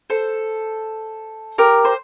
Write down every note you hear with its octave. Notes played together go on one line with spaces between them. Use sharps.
A4 C5
G4 A#4
C5